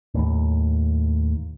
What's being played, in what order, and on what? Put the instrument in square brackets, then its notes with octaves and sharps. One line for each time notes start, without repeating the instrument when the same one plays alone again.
[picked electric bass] D#2 A2